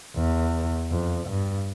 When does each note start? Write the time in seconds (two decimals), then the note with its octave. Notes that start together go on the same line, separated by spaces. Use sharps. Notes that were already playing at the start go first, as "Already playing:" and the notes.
0.16 E2
0.91 F2
1.28 G2